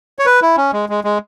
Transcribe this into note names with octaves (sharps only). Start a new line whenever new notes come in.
C#5
B4
E4
C#4
G#3
G#3
G#3